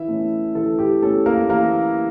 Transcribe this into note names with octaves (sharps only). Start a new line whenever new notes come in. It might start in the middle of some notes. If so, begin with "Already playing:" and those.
Already playing: E3 E4 E5
A3 C#4
E3 A4
G4
A3 C#4 A4
A#3 A#4
E3 A#3 A#4